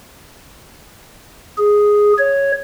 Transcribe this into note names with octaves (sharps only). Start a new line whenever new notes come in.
G#4
C#5